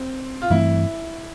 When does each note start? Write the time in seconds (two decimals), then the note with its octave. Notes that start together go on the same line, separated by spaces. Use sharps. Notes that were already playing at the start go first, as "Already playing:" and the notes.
Already playing: C4
0.42 F4
0.50 G2 E3 A3 C4 E4